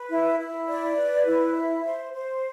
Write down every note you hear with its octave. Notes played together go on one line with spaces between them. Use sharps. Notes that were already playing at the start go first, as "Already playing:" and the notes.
Already playing: B4
E4
E4
D5
B4
E4
E5
C5
C5